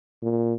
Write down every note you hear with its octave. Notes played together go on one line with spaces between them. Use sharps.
A#2